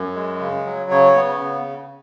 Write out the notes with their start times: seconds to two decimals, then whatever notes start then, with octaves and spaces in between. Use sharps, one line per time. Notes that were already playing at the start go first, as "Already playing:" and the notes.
Already playing: F#2
0.15 G#3
0.40 C#3
0.66 F#3
0.91 C#3 C#5
1.15 B3
1.40 C#3